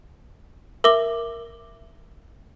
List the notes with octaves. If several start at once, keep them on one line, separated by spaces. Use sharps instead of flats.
A#4 E5 D6 G7